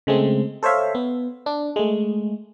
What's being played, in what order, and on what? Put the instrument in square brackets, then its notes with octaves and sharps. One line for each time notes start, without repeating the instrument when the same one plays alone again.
[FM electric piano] C#3 G#3 A3 C4
A4 C5 C#5 E5 F5
B3
D4
G#3 A3